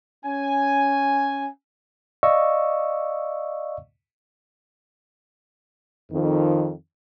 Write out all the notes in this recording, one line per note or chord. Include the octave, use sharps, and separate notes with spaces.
C#4 G#5
D5 D#5 F5 C#6 E6
F2 D#3